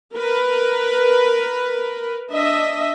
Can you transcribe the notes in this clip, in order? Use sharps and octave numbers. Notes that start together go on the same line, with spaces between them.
A#4 B4
D4 D#5 E5